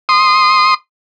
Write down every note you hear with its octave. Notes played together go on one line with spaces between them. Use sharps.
C6 D#6